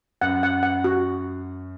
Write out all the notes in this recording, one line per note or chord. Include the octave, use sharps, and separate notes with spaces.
F#2 F#5
F#5
F#5
F#4